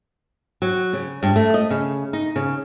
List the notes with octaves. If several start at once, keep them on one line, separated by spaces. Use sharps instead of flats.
F#3
C#3
G2
A3
D#5
C#3
D#4
C#3